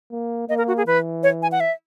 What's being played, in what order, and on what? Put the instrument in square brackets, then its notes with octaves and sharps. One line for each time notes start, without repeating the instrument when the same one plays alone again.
[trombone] A#3
[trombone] A#3 [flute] D#5
[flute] A#4
F#4
G#4
[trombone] E3 [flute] B4
[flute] C#5
G#5
F#5
E5